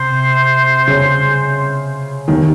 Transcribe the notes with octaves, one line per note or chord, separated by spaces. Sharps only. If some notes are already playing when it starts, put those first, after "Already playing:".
Already playing: C3 C5
C#3
D#2 D#3